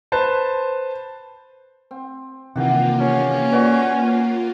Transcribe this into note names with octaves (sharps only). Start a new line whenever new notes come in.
B4 C5 A5
C4
C3 D#3 E3 A#3 F4 G4 F#5
B2 C#4
F#4 B4 D5